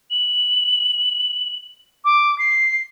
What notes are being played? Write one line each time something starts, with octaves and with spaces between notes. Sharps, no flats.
F#7
D6
C7